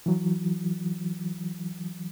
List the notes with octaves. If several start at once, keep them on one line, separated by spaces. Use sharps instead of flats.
E3 F#3